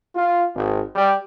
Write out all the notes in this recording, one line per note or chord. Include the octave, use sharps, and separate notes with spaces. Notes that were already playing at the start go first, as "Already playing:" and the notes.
F4
G#1
G3